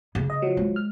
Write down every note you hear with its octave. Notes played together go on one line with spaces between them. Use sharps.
C#3
D#5
F3 F#3
G#3
F6